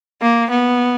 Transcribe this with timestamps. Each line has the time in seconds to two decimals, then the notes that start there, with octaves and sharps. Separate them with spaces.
0.22 A#3
0.50 B3